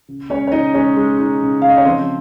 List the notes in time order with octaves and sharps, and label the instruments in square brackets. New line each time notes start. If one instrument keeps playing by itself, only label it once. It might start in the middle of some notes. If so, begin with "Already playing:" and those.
[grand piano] C#3
G#3 C#4 C#5
C#5
C#3 D#4 D#5
G#3 C#4 C#5
G#3
D#4
C#3
C#3 F5
D#5
C#5
F3 C4 C5